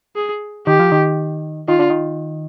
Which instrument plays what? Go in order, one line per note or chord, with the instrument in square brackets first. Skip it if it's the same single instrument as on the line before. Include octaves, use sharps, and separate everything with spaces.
[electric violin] G#4
[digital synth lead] D#3 [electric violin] G4
[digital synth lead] F3
D#3
[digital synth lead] D#3 [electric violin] F4
[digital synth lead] D3
D#3